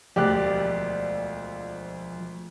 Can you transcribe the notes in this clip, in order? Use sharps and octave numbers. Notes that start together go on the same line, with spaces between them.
E1 D2 F3 G4 D5 F#6